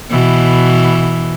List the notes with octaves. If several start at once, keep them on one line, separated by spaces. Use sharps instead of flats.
B2 E3